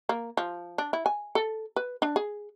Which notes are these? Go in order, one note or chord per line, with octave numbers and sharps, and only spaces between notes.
A#3
F3
D4
E4
G#5
A4
B4
D4
G#4